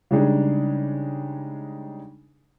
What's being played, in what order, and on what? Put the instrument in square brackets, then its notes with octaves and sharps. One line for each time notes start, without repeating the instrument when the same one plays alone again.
[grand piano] C#3 G3 G#3 D4 D#4 G#4